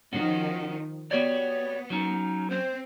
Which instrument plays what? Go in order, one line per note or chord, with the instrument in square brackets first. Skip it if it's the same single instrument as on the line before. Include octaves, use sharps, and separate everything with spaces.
[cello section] D#3 F3 [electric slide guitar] C#4 F#4
[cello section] B3 [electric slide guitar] F#4 G4 D5 [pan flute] C#5
[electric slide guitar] F#3 C#4 [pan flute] D#4
[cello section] C4 [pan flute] C5